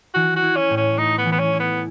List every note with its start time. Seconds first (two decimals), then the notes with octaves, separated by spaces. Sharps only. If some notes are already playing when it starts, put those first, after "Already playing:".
0.14 E3 F#4
0.36 F#4
0.42 E4
0.56 C#4
0.70 A2
0.77 C#4
0.98 A3 D#4
1.18 B3
1.26 E3
1.32 B3
1.39 C#4
1.53 E4
1.60 B3